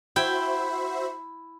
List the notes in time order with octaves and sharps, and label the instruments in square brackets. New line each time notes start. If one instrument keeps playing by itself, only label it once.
[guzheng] E4 G5 [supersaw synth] F#4 C5 E5